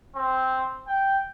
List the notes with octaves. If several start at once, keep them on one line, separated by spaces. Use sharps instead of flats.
C4
G5